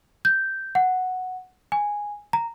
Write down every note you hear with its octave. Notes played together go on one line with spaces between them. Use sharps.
G6
F#5
G#5
A#5